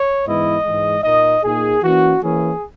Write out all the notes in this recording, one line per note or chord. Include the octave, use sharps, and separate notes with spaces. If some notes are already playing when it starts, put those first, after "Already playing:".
Already playing: C#5
G#2 E3 B3 E4 D#5
G#2 E3 G#3
A#2 A#3 D#4 D#5
A#2 A#3 D#4 G#4
E3 A#3 C#4 F#4
E3 A#3 C#4 E4 G#4